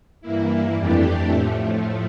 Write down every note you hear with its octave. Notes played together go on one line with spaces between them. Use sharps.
G2 E3 A#3 E4
F2 E3 A3 D4 G4
A2 F3 A3